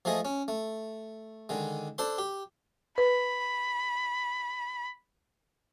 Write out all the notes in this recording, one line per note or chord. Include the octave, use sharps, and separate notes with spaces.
F3 A3 G#4 D#5
C#4
A3
D3 D#3 G#3
D4 A4 C5 C6
G4
B4 B5